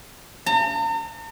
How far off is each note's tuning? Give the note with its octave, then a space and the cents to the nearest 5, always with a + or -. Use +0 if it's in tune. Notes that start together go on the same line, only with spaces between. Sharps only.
A#5 -45